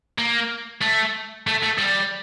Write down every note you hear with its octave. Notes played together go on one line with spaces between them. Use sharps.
A#3
A3
A3
A3
G3